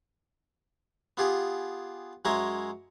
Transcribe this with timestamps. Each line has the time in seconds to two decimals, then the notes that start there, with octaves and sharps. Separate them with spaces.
1.17 B3 F4 G4 G#4
2.25 F#2 G#3 E4 C#5 A#5 C6